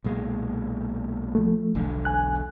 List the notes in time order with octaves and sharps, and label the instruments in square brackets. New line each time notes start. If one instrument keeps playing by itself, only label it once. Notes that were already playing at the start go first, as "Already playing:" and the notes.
[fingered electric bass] B1 A#2 G#3
[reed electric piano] F3 A3
[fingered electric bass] E1 B1 D3
[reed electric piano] G#5 F#6